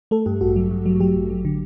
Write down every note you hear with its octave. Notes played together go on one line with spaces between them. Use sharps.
A3 A4
G2 G4
A1 F#4
F#3
G2
F#3
F#3 G4
A1
F#3
D3